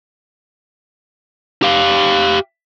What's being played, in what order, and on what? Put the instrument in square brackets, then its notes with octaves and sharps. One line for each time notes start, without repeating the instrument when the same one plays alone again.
[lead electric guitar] G4 F5